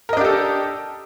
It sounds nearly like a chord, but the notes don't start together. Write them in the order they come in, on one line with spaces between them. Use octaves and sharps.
A#4 D#5 D4 G4 A4